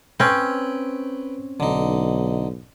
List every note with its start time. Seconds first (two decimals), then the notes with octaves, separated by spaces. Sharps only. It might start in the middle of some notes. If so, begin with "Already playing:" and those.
0.20 C4 C#4 B4 G5
1.60 B1 D3 D#4